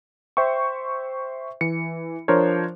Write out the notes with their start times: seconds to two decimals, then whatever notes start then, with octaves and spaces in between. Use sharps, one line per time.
0.37 C5 E5 G5 C#6
1.61 E3 C#7
2.28 F3 D4 A#4 C5 C#5